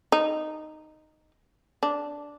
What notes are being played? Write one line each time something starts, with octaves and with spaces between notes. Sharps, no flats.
D#4
D4